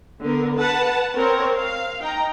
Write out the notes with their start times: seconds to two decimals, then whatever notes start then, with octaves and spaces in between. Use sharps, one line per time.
0.22 D3 B3 A#4
0.56 B4 F#5 A5
1.13 C4 A#4 C#5
1.56 F5
2.01 D#4 G5 A#5